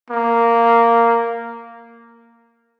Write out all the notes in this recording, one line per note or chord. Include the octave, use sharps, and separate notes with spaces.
A#3